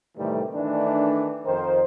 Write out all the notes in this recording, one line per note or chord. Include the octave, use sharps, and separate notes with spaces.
A2 C3 D#3 E3 G3 A3
D#3 E3 A3 D4
F2 D#3 A#4 C5